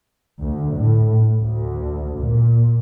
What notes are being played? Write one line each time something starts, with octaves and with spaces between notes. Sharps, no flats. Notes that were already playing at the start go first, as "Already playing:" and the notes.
D2
A2
D2
A#2